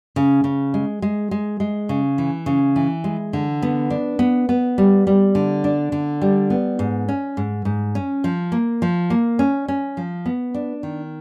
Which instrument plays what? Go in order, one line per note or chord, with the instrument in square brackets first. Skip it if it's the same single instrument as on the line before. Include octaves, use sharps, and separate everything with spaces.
[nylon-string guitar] C#3
C#3
G#3
G#3
G#3
G#3
C#3
E3
C#3
E3
G#3
D3
B3
D4
B3
B3
G3
G3
D3
D4
D3
G3
B3
G#2
C#4
G#2
G#2
C#4
F3
A#3
F3
A#3
C#4
C#4
F3
B3
D4
D#3